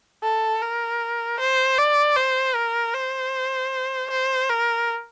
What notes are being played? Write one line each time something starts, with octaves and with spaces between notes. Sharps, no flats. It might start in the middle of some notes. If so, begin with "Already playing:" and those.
A4
A#4
C5
D5
C5
A#4
C5
C5
A#4